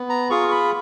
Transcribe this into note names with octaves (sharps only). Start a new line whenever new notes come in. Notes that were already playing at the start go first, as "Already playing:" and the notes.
Already playing: B3
A#5
F4 G#4 C#6
C#6
B5